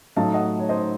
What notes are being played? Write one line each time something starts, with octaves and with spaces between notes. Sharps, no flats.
A2 F#3 A3 D#4 F5 A5
D#5 F#5
C#5
C5 D#5